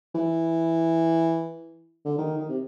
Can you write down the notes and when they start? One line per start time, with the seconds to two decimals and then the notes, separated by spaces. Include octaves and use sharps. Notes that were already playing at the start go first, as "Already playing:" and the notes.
0.15 E3
2.05 D3
2.18 D#3
2.38 D#3
2.49 C3